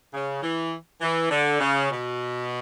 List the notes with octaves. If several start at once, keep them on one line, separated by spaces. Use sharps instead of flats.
C#3
E3
E3
D3
C#3
B2